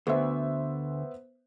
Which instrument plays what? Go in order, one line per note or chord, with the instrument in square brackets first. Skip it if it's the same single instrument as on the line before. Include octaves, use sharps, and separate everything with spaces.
[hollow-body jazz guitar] D2 [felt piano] B3 C5 E5